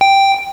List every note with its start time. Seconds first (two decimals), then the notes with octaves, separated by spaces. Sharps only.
0.01 G5